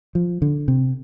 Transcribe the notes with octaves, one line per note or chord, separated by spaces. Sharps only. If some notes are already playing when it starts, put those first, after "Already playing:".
F3
D3
C3